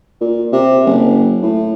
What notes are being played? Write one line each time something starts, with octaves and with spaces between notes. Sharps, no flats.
A#2
C3
F#1
A2